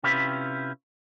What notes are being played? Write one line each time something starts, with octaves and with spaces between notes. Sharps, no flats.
C3 C#4 E4 F4 G4 B4